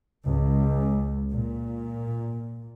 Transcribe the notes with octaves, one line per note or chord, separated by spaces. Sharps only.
C#2
A#2